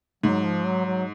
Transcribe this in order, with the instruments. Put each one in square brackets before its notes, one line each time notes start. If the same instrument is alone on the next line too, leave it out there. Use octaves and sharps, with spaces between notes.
[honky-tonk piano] G#2 [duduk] F#3
[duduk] F3
F#3
F#3